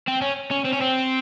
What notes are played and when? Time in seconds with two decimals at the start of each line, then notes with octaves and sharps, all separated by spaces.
0.08 C4
0.21 C#4
0.51 C#4
0.65 C4
0.73 C#4
0.81 C4